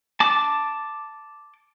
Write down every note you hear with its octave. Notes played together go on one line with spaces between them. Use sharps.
A5 D6